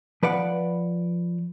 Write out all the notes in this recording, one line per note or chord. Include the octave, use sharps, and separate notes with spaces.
F3 B4 D5 F#5